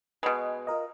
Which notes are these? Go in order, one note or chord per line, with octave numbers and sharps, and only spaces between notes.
B2 G#3 B4 G#5
F4 A#4 D#5